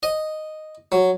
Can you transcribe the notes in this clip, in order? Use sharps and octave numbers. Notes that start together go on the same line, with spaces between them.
D#5
F#3